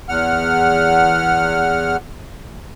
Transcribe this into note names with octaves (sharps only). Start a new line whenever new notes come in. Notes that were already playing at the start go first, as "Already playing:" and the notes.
E2 F#5 F6